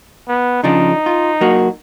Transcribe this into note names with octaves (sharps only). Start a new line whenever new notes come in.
B3
C#3 F3 D4 D#4
F4
F#3 A#3 F#4